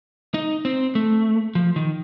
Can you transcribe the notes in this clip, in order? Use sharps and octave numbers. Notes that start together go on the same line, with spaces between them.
D#4
C4
A3
F3
D#3